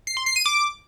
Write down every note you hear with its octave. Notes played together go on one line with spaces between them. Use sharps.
C7
C6
C7
D#7
D6